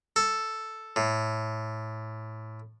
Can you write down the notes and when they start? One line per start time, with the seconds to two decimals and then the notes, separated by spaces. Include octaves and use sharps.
0.16 A4
0.96 A2